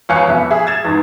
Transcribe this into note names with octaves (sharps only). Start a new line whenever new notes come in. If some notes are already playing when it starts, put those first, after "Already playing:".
E2 C#5 F5 G#5 F#6 C#7
F2 B3 E5
G#4 E5 G#5
G#6 A6 E7
E2 G#2